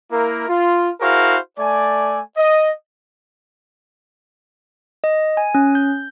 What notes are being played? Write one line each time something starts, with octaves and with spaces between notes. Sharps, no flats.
A#3 E4 A#4
F4
E4 F#4 G#4 A#4 C5 F5
A3 D5 G#5
D#5
D#5
G#5
C#4
G6